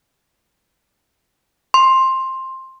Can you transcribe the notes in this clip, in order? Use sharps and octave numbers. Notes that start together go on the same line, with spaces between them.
C6